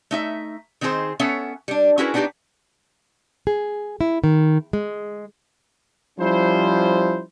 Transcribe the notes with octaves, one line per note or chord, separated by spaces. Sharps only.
A3 D#4 E5
D#3 C4 D#4 G#4 C5
B3 C#4 A4 C#5 E5 F#5
G3 D4
C#4 E4 F#4 G#4 A#4 B4
B3 D4 D#4 F#4 G4
G#4
E4
D#3
G#3
F3 G3 C#4 E4 C5